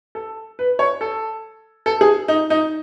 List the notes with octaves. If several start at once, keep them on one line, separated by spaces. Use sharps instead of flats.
A4
B4
C#5
A4
A4
G#4
D#4
D#4